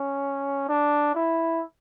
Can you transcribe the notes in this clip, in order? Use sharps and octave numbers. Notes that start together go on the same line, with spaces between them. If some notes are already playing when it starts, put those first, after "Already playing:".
Already playing: C#4
D4
E4